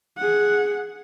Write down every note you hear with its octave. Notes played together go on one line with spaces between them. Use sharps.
G#4 F#5